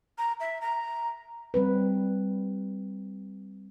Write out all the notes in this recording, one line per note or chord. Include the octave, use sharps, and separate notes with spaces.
A#5
E5
A#5
G3 C4 B4